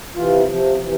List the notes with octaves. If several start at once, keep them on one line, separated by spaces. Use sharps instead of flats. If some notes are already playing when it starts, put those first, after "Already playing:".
C3 E3 F4
C3 F3
C3 E3